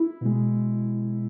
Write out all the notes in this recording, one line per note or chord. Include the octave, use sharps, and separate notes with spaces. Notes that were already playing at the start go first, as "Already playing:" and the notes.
Already playing: E4
B2 G#3